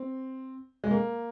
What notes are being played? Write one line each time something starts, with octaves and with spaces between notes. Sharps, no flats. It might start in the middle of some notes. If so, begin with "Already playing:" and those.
Already playing: C4
G#3
A#3